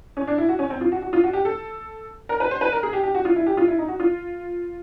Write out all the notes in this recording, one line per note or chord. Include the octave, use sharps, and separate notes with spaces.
C#4
D4
E4
F#4
C#4
C4
F4
F#4
F#4
F4
F#4
G4
A4
A#4
B4
C5
B4
A#4
G#4
G4
G4
F#4
F4
E4
G4
F4
E4
D#4
F#4
F4